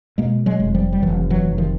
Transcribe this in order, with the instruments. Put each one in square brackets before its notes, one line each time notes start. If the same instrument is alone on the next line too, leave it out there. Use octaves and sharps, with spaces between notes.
[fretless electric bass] B2 G#3 A#3
F#3 G#3
F1
F3 G3
G3
F1 E3 F#3
E3 F#3
F1
D#3 F3